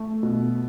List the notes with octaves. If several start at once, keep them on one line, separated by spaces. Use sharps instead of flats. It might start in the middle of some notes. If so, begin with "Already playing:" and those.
Already playing: A3
B2